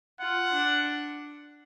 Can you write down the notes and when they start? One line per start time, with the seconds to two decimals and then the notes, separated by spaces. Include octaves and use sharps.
0.20 F4 F#5
0.53 D4